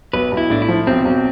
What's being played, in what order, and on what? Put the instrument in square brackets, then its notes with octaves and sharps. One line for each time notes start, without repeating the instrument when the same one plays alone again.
[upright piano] B1 [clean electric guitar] B4
[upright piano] B1
[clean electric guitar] E4
[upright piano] A2 [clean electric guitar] D4
[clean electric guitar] E4
[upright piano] F3
[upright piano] B1 [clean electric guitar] C4
[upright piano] B1